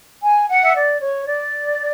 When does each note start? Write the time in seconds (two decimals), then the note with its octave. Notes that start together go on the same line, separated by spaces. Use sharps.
0.22 G#5
0.48 F#5
0.63 E5
0.75 D5
1.01 C#5
1.26 D5